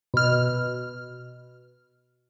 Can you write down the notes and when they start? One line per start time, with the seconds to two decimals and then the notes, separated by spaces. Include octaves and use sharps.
0.14 B2 F6